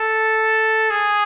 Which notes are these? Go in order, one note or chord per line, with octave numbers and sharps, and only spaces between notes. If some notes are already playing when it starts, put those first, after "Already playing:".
Already playing: A4
G#4